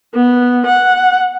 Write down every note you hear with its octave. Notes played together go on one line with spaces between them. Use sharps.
B3
F#5